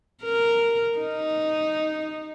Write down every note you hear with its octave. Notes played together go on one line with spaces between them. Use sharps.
A#4
D#4